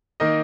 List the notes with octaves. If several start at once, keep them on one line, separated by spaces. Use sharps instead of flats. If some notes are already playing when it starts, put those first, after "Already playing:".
D#3 A#3 D#4 D#5